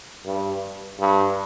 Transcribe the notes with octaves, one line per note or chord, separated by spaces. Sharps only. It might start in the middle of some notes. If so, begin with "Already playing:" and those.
G2
G2